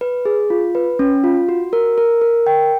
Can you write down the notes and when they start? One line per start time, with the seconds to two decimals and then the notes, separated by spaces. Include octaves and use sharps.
0.01 B4
0.25 G#4
0.50 F4
0.75 B4
0.99 C#4
1.24 F4
1.49 F#4
1.73 A#4
1.98 A#4
2.21 A#4
2.47 G5